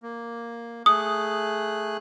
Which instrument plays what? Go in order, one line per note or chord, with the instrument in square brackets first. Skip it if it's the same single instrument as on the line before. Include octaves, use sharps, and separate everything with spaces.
[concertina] A#3
[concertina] A3 G#4 F#6 [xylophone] D#6